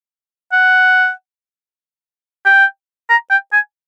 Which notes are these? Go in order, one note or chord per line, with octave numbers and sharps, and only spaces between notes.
F#5
G5
A#5
G5
G#5